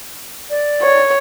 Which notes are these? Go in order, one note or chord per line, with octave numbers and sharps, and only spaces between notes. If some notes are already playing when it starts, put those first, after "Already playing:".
D5
C#5